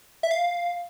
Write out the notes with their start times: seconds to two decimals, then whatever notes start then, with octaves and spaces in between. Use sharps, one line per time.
0.23 E5
0.31 F5